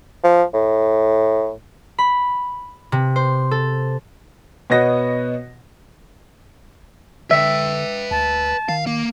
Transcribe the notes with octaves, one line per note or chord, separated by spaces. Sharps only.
F3
A2
B5
C3
C5
A4
B2 B3 F#4 C#5 D#5 A#6
D3 B4 E5 G5
D2 A5
D#3 F5
A#3